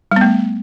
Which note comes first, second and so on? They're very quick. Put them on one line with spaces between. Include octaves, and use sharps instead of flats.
G3 B3 A3